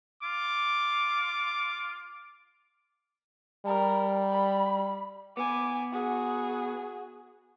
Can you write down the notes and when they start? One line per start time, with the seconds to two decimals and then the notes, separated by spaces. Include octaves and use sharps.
0.23 F4 D6
3.66 G3 A#4
4.31 B5
5.37 B3 G#5 D6
5.93 F#4 G#4